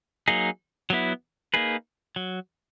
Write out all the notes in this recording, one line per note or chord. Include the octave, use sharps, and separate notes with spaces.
F#3 A#3 D#4 G#4
F#3 B3 E4
A#3 D#4 G#4 B4
F#3